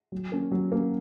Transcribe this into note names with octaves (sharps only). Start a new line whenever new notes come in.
F#3
A#3 C#4
F#3
A#3 C#4